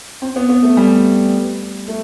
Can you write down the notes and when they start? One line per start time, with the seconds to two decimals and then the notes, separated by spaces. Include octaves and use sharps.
0.22 C4
0.36 B3
0.49 B3
0.63 A3
0.77 G3
1.88 A3